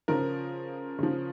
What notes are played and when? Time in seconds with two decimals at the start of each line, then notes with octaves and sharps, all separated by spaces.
0.08 C#3 F3 A#4
0.99 C#3 F3